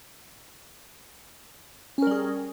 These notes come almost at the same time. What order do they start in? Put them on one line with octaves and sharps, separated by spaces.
C#4 A#4 G3 G#4